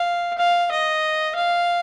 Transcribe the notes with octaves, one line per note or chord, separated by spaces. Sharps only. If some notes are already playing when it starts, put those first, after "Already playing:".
Already playing: F5
F5
D#5
F5